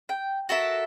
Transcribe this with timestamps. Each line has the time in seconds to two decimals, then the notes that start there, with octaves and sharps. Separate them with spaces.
0.09 G5
0.49 F#4 A4 A#4 E5